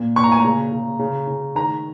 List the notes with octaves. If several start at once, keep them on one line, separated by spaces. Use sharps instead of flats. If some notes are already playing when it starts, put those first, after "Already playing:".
Already playing: A#2
A#2 C#6
A#5
G#5
C#3 A#5
C#3
C#3
C#3
D#3 A#5